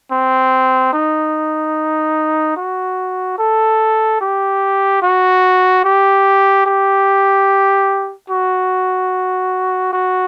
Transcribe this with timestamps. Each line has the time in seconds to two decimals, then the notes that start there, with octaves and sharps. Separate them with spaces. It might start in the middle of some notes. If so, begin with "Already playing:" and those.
0.11 C4
0.93 D#4
2.56 F#4
3.39 A4
4.21 G4
5.02 F#4
5.84 G4
6.66 G4
8.30 F#4
9.93 F#4